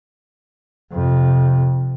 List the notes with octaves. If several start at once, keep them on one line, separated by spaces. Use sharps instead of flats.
F2 C3